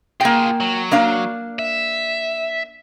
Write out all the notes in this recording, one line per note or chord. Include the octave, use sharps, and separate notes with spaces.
A#3 F4 G#4 G5
F#3
A#3 D4 F5
E5